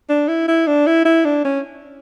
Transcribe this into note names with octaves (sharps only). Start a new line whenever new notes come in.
D4
E4
E4
D4
E4
E4
D4
C#4